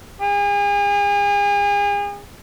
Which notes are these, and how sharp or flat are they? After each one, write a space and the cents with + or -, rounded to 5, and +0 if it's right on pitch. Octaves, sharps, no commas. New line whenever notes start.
G#4 -40